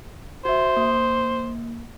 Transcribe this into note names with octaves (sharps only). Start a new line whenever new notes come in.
F#4 C5 E5
A#3